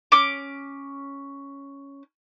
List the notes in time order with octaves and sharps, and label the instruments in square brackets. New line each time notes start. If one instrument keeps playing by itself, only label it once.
[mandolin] C#4 D6